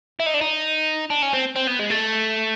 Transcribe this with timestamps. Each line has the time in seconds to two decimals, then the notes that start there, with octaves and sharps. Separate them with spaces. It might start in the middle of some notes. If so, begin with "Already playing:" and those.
0.20 E4
0.26 D#4
0.34 D4
0.41 D#4
1.10 D4
1.22 C#4
1.34 C4
1.56 C4
1.68 B3
1.80 G#3
1.90 A3